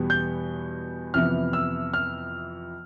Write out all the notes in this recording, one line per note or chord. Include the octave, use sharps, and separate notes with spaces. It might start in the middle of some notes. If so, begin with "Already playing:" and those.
Already playing: E2 B2 G3 B3
G6
F2 C3 E3 B3 F6
E6
F6